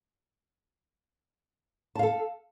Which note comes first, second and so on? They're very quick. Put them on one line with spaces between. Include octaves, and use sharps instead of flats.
A5 F5 A4